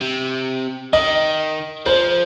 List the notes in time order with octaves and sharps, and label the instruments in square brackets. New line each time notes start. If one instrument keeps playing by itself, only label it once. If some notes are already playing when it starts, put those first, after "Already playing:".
[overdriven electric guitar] C3
[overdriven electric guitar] D#3 [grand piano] D#5
[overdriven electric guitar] F3 [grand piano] C5